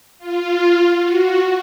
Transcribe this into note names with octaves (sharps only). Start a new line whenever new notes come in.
F4
F#4